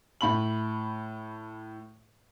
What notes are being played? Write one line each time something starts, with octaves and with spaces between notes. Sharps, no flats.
A2 B5 F#7